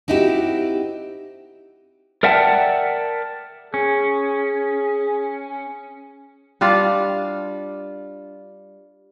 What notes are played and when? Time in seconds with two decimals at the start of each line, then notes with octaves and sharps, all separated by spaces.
0.08 C4 D#4 E4 F#4 G4
2.23 A#4 D5 E5 F#5 G5 A5
3.74 C#4 G#4
6.61 G3 D4 F4 F5